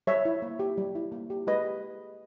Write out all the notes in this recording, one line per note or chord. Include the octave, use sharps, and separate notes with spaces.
G3 C#5 E5
E4
A#3
G4
G3
E4
A#3
G4
G#3 B4 D#5
G4